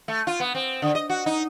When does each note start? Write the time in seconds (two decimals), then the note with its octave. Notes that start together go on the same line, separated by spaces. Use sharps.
0.08 A3
0.27 F4
0.40 B3
0.55 C4
0.82 D3
0.95 D#5
1.09 F#4
1.26 D#4